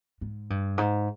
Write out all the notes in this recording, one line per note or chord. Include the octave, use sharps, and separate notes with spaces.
G#2
G2
G#2